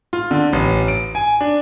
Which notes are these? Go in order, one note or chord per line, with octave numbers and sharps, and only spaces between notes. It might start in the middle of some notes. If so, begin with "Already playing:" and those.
F4
D3
A1
D7
G#5
D4